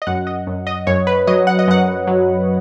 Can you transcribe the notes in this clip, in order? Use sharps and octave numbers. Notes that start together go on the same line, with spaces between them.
D#5
F#2 F#5
D#5
F#2
D#5
F#2 C#5
B4
F#3 D#5
F#5
D#5
F#2 F#5
F#3